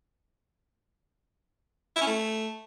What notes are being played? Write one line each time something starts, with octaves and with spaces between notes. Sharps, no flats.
E4
C#4
A3